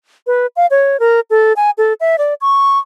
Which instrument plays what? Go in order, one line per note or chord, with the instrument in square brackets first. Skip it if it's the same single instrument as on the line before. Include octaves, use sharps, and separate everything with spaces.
[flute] B4
F5
C#5
A#4
A4
G#5
A4
E5
D5
C#6